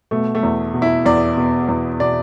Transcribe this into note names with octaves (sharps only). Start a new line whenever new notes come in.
B2 A3
A3
E2
B2
E4
E2 D5
B2
E2
B2 D5